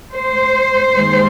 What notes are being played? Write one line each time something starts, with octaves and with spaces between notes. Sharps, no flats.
C5
D#2 D#3 G#3